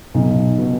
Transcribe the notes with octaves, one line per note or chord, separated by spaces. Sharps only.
B1 D#4
B2